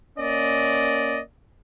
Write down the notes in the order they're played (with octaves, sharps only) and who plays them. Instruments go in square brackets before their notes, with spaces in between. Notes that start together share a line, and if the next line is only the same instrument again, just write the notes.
[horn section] A#3 C#4 D5 D#5